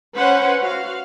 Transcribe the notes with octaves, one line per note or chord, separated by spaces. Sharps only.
C#4 B4 C5 F#5
F#4 F5